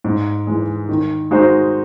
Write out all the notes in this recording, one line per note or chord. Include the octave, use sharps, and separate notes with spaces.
G#2
E3 G#3
D#3
G#3 D#4 F#4 C5